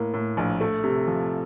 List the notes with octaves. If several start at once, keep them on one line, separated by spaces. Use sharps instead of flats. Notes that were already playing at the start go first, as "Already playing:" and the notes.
Already playing: A2 A#3
A2
A#1
A3
C3
F3